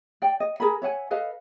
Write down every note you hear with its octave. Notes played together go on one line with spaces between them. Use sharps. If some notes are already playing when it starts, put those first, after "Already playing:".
D5 G5
D#5
G#4 A#4 B4 B5
C#5 E5 F#5 G#5
A4 B4 D#5 F5